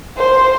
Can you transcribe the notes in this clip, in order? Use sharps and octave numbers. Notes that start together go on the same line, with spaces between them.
C5